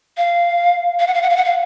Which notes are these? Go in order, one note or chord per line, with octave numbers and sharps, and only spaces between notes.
F5
F5
F#5
F5
F#5
F5
F#5
F5